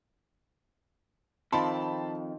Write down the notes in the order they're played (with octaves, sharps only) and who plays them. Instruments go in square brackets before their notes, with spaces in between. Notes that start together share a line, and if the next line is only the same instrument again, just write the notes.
[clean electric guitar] F2 [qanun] D#3 F3 C4 [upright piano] A5 B5 C6